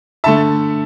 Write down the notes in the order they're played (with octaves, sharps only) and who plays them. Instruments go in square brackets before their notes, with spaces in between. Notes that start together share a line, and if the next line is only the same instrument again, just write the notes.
[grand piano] D3 A3 E5 A5